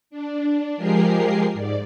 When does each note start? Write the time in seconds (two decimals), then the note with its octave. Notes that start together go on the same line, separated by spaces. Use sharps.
0.10 D4
0.77 F3 G#3 G4 G#4 A#4 C7
1.53 G#2 D5